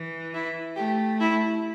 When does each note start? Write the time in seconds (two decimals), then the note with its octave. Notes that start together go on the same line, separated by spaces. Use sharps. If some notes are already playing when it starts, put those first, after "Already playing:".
Already playing: E3
0.34 E4
0.76 A3 G4
1.20 E4